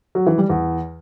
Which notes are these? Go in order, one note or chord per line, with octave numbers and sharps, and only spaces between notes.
F#3
E3
G3
E2